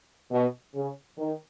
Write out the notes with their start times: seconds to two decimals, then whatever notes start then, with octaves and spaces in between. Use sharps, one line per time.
0.31 B2
0.75 C#3
1.18 D#3